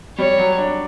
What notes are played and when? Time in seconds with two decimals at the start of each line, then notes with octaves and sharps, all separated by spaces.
0.18 G3 C#5
0.38 F#3
0.58 D4